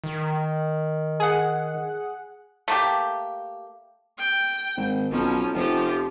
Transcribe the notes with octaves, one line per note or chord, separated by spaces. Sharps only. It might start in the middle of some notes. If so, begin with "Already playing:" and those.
D#3
G#4 F#5
A3 A#3 G4
G5
G#1
B1 F3 C#4
F1 F3 G4